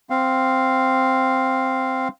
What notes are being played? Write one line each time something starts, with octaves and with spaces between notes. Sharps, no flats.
C4 F5